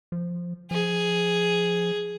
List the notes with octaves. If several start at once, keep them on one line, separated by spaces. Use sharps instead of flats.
F3
F3 G#4